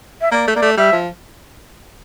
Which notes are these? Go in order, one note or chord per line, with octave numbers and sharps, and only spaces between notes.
E5
A#3 D5
A3
A#3 D5
A3
G3 E5
F3